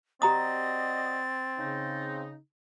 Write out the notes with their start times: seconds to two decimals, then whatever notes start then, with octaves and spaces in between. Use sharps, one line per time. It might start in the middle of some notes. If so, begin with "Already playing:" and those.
0.22 C4 F#4 G4 D5 D#5 A#5 D#6 A6
1.59 C#3 D#4